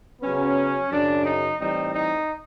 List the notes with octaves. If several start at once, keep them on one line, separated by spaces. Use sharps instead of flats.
C#3 F#3 B3 C#4
F#2 C#3 F#3 D4
D#4
A2 E3 G3 C4 D#4
D#4